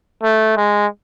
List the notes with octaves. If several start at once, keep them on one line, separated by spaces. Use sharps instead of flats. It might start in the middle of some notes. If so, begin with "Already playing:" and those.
A3
G#3